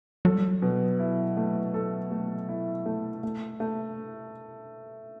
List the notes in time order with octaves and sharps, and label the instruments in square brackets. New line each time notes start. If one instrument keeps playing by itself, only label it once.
[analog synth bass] F#3 [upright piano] A4
[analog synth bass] G3
F#3
[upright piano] B2
E4
A3
A4
A3
E4
A3
A3
A3